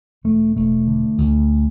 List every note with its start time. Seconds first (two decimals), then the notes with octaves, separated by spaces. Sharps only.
0.24 E1 A3
0.56 E1 A3
0.87 D3
1.18 D2